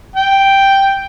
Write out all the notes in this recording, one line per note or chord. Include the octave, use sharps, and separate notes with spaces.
G5